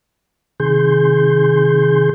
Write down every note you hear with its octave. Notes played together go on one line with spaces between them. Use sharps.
C3 D#3 G#4 C6 G6